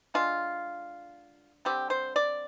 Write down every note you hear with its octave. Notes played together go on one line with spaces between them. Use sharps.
D3 G#3 D4 F4
D3 G3 C4 G4
C5
D5